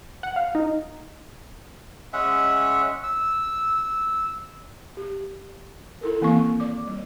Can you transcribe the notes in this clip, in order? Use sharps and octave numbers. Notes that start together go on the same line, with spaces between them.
F#5
F5
D#4
G#3 C#4 E5 F#5
E6
G4
E4 A4 A#4
D#3 E3 A#3 C4 F5 C#6
D5 D6
G3